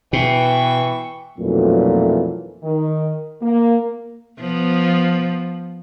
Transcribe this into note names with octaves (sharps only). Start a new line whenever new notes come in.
B2 E3 G5 C#6
B1 F2 A#2 E3 F#3 A3
D#3
A#3
F3 B3